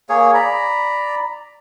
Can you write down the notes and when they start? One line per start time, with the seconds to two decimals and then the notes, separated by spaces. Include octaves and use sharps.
0.09 A#3 G#4 C#5
0.34 D5 A#5 B5